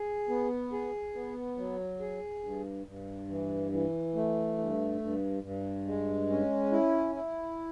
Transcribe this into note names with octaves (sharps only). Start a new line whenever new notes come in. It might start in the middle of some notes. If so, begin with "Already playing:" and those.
Already playing: G#4
B3
G#4
B3
F#3
G#4
G2
G2
E3
E3
A3
G2
G2
G2
G#3
C#4
E4
E4